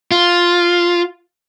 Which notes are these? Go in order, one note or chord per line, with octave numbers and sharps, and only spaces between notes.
F4